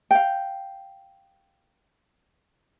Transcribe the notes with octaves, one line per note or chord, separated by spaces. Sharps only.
F5 G5